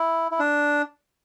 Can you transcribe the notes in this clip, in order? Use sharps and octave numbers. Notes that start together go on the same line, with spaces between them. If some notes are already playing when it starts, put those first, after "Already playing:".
Already playing: E4
E4
D4